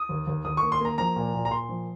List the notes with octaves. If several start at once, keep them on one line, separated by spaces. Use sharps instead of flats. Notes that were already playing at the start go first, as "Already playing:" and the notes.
Already playing: D#6
D#2
D#2
D#2 D#6
A#3 C#6
C6
A#3 A#5
F3 A#5
A#2
A#2
A#5
A#2 C6
F3